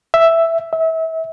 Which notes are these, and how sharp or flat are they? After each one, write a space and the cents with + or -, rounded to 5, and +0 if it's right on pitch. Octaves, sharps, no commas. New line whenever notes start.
E5 +5
E5 -30